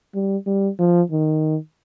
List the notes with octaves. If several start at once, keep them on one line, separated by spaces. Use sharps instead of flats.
G3
G3
F3
D#3